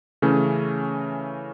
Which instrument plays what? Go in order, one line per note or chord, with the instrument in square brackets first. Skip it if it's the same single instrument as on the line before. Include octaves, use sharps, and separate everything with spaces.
[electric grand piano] C#3 E3 A3 C#4